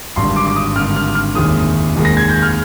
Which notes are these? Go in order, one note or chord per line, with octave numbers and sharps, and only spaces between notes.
G#1 G2 D3 C6
D6
D6
D#6
G#1 G2 D3 F6
F6
F6
F1 D#2 D#3 G#3 D#6
F1 D#2 D#3 G#3
A#6
G#6
G6
F6